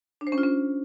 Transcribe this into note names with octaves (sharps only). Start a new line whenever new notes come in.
D4
C5
C#4
F4
C#4